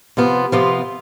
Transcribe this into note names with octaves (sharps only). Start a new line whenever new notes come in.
C3 F3 B3 F4
C3 F3 B3 F4